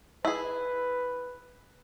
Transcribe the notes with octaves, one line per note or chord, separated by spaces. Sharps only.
E4 G#4 B4